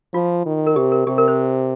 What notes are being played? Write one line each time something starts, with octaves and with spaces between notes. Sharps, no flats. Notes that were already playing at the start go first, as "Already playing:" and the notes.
F3 F4
D#3
A#4
C3 G4
A#4
C3 G4
A#4
C5